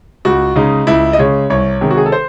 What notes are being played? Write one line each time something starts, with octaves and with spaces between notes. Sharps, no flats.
C#2 F#4
C#3 G#3 D#4
C#2 E4
D#5
C#3 G#3 C#5
C2 C#5
C3 D#3 G#3
F#4
G#4
A4
C5